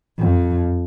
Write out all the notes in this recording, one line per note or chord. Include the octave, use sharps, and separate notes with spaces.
F2